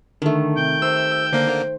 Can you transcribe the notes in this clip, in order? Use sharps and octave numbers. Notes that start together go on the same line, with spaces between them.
D3 D#3 A3
C3 G5
G4 C5 E6
D3 A#3 C5